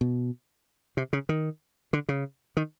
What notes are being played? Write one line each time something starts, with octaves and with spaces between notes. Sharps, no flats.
B2
C3
C#3
D#3
D3
C#3
D#3